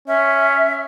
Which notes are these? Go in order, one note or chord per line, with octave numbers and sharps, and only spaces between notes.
C#4 E5